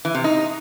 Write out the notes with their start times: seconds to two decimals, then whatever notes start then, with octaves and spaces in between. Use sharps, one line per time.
0.05 E3
0.15 C3
0.24 D#4